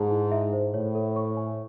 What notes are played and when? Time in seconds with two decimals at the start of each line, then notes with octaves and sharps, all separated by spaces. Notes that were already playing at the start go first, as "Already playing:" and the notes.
Already playing: G#2 G#4 A5
0.11 E4
0.32 E5
0.53 C5
0.74 A2 C#5
0.95 A4
1.16 C#6
1.37 G#5